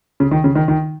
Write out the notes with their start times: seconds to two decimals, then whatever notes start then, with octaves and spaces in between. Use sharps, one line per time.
0.20 C#3
0.31 D#3
0.44 C#3
0.55 D#3
0.68 D#3